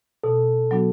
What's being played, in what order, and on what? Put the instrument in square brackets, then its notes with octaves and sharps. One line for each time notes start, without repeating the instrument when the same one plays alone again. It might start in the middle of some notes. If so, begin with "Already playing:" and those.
[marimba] B2 [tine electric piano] A4
[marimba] F#3 B3 D4 F#4